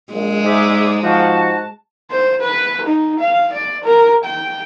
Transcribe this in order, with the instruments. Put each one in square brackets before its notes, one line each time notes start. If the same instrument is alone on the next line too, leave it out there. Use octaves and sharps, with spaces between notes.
[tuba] A#1 [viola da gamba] G#3
[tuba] G#2 [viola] G#4 D5 [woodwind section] E5
[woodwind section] G#2 F#4 [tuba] F3 [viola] A5
[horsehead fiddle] C5
B4
D#4
F5
D5
A#4
G5